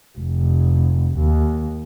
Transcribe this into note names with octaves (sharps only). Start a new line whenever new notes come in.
F1
D#2